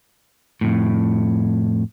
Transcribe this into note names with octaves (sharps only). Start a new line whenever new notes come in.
F2 A2